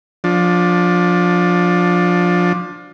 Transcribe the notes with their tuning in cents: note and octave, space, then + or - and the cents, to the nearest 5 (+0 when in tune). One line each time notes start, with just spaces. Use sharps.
F3 +25 D4 +0